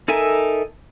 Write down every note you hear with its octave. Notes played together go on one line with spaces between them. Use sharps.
D#4 A4 A#4 E5 G#5